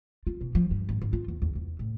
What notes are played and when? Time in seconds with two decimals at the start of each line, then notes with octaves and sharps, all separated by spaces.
0.27 F4
0.41 B2
0.55 F3
0.71 G2
0.89 G#1
1.02 G#1
1.13 F4
1.28 E2
1.42 E2
1.55 E2
1.79 A2